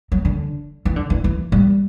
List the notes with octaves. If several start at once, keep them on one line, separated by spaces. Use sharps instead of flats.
F#3
D3
E3
D3
E3
E3
G3